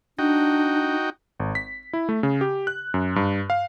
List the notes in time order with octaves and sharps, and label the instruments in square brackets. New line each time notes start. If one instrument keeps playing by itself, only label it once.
[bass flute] D4 [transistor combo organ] D#4 F#4 G5
[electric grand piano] G#1
B6
E4
A3
C#3
G4
F#6
F#2
G2
F5